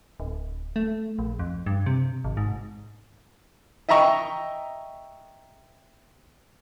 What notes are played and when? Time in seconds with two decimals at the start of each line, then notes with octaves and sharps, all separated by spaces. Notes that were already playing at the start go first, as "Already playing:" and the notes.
0.20 D1
0.76 A3
1.19 A#1
1.39 F2
1.66 G2
1.86 C3
2.24 G#1
2.37 G#2
3.89 D#5 E5 G5 A#5 C#6